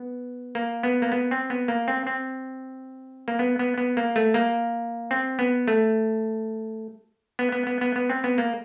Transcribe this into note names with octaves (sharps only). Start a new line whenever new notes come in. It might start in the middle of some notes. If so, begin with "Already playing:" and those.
Already playing: B3
A#3
B3
A#3
B3
C4
B3
A#3
C4
C4
A#3
B3
B3
B3
A#3
A3
A#3
C4
B3
A3
B3
B3
B3
B3
B3
C4
B3
A#3